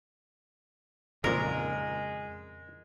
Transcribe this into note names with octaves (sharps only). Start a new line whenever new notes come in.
G#1 F2 A#2 C#3 G#3 A#4